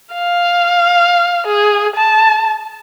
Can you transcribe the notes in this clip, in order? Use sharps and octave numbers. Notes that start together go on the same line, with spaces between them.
F5
G#4
A5